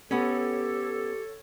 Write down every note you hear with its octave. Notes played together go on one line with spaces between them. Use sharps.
B3 C#4 G4 A4 C#5